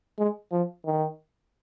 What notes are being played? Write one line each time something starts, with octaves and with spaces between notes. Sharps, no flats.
G#3
F3
D#3